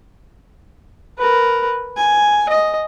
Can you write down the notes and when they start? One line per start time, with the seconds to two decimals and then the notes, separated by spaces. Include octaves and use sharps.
1.18 A#4 B4
1.96 G#5
2.49 D#5